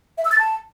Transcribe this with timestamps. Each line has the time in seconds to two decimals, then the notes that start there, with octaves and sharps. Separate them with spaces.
0.18 E5
0.25 E6
0.32 A6
0.39 A5